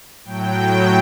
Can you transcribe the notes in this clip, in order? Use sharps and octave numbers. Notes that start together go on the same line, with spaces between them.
A2 F#3 G5